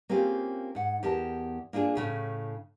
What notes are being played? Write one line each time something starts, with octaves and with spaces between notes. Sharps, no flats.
A#3 C4 C#4 F4 G4 G#4
G#2 F#5
E2 G4 A#4 A5
A#3 D4 F4 G4 G#4
A2 C#3 C#4